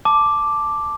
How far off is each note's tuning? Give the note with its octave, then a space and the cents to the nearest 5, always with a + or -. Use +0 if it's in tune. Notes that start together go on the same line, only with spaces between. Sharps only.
A5 +0 D6 +0